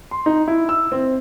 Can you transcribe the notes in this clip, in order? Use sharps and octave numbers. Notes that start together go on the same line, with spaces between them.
C6
D#4
E4
E6
C4